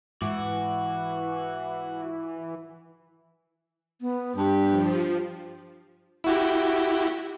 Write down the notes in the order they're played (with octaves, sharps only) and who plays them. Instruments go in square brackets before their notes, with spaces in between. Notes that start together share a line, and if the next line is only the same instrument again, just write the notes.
[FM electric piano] G#2 D6 [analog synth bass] E3 [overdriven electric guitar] F#4
[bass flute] B3
[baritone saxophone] G2 [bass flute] D4 [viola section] G4
[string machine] F3
[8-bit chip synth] E4 F#4 G4